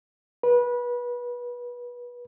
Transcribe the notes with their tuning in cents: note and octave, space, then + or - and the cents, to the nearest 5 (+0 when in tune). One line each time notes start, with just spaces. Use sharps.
B4 -25